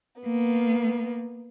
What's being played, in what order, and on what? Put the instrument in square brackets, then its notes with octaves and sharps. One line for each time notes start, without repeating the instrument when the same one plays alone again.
[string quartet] A#3 B3